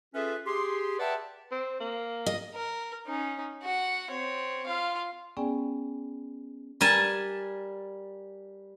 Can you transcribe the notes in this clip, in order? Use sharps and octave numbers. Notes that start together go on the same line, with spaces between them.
C#4 F4 G#4 A4 B4 E5
G4 G#4 C6
B4 D5 E5 F#5 G5 A5
C4
A#3
D#5
A#4
C#4 D#4
F#4 F#5
C4 C#5
F4 F5
B3 C#4 G#4 D5 G5 G#5
G3 A#4 G#5 A5